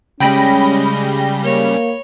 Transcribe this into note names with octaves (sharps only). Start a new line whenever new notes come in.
C#3 G3 G#3 C#4 G5 B5 A#6
A#3 C#5